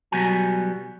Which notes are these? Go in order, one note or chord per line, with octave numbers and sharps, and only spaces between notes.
B2 F#3 G3 B3 F#4 G#5